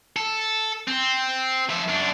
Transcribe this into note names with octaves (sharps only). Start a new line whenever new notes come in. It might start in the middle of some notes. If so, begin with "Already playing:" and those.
A4
C4
F3 E5
F#2 D4